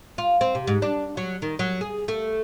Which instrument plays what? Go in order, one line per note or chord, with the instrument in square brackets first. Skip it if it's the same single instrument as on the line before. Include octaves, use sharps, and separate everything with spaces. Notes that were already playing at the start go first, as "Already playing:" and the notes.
[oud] F4
C4
C3
G#2
D4
F#3
D#3
F#3
G#4
A3